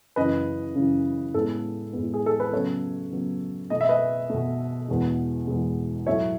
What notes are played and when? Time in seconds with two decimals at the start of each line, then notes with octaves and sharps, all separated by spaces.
0.16 F#2 C#3 E3 B4 D#5
0.76 F#2 C#3 E3
1.34 A2 G#3 B3 A4
1.93 A2 G#3 B3
2.14 G#4
2.26 A4
2.40 B4
2.52 C#3 F#3 B3 A4 C#5
3.12 C#3 F#3 B3
3.70 B2 A3 D#5
3.81 E5
3.89 B4 D#5
4.30 B2 A3
4.88 E2 B2 G#3
5.47 E2 B2 G#3
6.06 A2 F#3 A3 C#5 E5